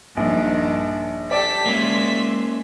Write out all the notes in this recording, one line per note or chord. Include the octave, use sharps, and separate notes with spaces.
A#1 G2 D#3 F3 D4
G4 A4 D5 B6
G#3 A#3 C#4 E5 C6